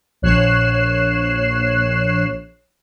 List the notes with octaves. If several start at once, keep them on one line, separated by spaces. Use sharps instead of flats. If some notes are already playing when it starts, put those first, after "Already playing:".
A#1 C#5 F#6 C7 E7